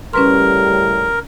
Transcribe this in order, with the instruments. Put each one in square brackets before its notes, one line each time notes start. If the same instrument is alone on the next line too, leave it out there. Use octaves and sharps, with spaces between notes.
[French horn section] A2 C#3 G3 [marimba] C#4 B4 C6 [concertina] A#4